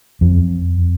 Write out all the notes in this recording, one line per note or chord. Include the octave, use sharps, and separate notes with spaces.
F2